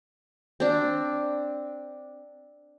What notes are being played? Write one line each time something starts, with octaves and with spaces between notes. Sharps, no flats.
C4 D4